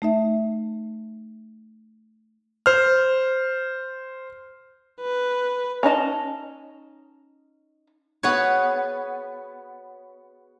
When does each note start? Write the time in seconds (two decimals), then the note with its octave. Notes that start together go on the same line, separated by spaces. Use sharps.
0.02 A3 D#4 E5
2.66 C5 F6
5.02 B4
5.83 C#4 D#4 D#5 A5
8.23 B3 F#4 G#4 B4 C#5